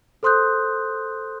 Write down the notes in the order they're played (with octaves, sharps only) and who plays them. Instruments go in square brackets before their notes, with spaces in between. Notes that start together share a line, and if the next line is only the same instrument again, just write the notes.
[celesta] A4 C5 C6 D#6 F#6 G6